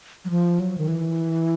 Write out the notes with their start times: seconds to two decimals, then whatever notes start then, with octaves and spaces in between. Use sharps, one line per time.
0.25 F#3
0.30 F3
0.60 F#3
0.78 D#3
0.88 E3